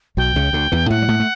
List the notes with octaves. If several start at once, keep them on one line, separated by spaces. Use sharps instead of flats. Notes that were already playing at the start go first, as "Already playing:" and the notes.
B1 B2 G5
C#2 C#3
D2 D3
E2 E3
A2 A3 F#5
G3
A2 A3
A3